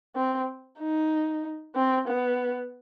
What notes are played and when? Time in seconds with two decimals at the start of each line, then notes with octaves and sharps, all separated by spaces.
0.15 C4
0.79 D#4
1.75 C4
2.07 B3